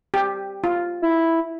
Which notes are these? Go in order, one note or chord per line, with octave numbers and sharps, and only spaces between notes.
G4
F4
E4